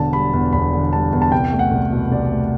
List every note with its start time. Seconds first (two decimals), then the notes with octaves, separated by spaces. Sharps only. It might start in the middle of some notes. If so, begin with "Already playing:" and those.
Already playing: E1 D3 A5
0.13 G3 B5
0.33 E2
0.53 E1 B5
0.73 D3
0.93 G3 A5
1.12 E2
1.22 A5
1.32 C2 G5
1.52 A3
1.59 F#5
1.71 C2
1.92 B2
2.11 C2 D5
2.32 A3